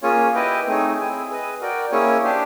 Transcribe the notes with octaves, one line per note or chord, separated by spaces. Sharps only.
A#3 C#4 F4 G#4 C#5
E4 G4 B4 D#5 G5
A3 C4 D#4 G#4 C#5
C4 E4 G#4
G#4 B4 D#5
F#4 A#4 D5 G5
A#3 C#4 E4 G#4 C#5
D4 G4 C5